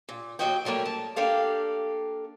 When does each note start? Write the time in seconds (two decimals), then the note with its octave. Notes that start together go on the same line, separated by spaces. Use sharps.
0.09 A#2
0.39 D#2 F3 F#3 F#4 D#5 G5
0.65 F#3 G3 A3 A#3
0.85 A5
1.16 A#3 D4 G4 A4 F5